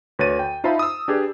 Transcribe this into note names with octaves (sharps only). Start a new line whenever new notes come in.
D2 B4 C#5 A6 D#7
G5
D#4 F4 C5 E5 A5 B5
D#6 E6
D4 G4 G#4 B4 D5